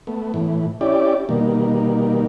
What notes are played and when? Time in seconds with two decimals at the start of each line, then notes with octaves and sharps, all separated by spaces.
0.07 A3 B3
0.34 A2 E3
0.81 C#4 E4 G4 D5
1.29 B2 D#3 G3 A#3